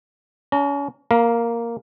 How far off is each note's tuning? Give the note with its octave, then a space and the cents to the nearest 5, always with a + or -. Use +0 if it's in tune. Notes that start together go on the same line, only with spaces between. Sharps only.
C#4 +35 A#5 -25
A#3 +0 F5 +0 A#5 +35